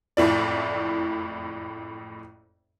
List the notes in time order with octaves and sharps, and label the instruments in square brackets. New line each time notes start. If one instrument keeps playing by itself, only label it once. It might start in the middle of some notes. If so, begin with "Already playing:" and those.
[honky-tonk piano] F#1 F2 A2 E4 D5